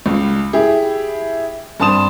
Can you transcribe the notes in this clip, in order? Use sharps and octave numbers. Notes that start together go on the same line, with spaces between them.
C#2
E4 G4 G#4
G2 C4 A5 C6 D#6 E7